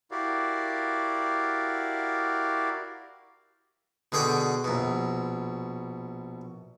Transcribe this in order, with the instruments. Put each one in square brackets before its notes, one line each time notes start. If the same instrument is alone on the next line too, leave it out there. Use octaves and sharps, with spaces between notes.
[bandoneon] E4 F#4 G4 A#4 D5 F5
[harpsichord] B2 D3 G#4 G5 C#6 D6
A#1 B2